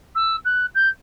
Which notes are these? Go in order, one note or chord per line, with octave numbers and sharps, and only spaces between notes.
E6
F#6
G6